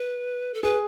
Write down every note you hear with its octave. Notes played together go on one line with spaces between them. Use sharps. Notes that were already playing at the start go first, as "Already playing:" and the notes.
Already playing: B4
A4
G#4 B4